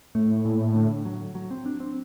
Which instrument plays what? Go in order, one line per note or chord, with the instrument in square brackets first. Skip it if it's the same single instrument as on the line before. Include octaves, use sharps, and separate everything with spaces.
[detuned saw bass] A2 [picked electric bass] A3
[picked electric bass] A#2
D3
F#3
F#3
C4
D4
C4